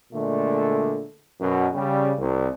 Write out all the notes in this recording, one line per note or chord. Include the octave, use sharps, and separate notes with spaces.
A#2 D3 G#3 A3
F#2 B2
C#3 G3
C2